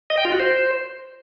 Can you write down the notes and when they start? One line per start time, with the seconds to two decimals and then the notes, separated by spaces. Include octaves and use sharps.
0.10 D#5
0.18 G5
0.25 F4
0.32 F#4
0.40 C5